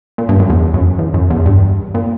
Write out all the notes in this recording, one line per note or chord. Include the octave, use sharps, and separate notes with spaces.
A#2
G2
F#2
E2
F#2
E2
F#2
E2
G2
A#2